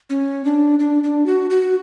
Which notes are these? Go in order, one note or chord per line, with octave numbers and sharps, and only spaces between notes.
C#4
D4
D4
D4
F#4
F#4